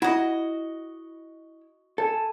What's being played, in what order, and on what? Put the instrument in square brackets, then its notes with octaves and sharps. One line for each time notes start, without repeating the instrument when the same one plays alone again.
[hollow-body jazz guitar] E4 B5 [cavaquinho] F#4 D#5
[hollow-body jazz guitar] A4 [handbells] G#5 A5